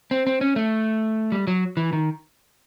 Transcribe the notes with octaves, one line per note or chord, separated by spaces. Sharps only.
C4
C4
C#4
A3
G3
F#3
E3
D#3